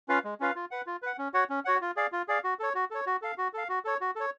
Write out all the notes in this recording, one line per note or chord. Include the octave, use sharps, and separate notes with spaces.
C#4 F4 B4 F5
G#3
C#4 F4 B4 F5
F4
B4 F#5
F4
B4 F#5
C#4
F#4 C#5 F#5
C#4
F#4 C#5 F#5
F4
G#4 D5 F5
F4
G#4 D5 F5
F#4
A4 C#5
F#4
A4 C#5
F#4
A4 F5
F#4
A4 F5
F#4
A4 C#5
F#4
A4 C#5